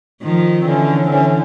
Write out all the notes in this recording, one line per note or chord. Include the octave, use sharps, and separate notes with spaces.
D#3 F3
C4
D3 E3 C#4
C4
D3 E3 C#4